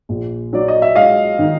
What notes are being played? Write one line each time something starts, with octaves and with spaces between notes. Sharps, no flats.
A#1
F#3 D5
D#5
E5
G#3 D#5 F5
D#3